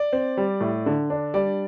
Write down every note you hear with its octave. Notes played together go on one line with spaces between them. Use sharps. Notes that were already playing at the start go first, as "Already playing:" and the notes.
Already playing: D5
C4
G3
A2
D3
D4
G3 D5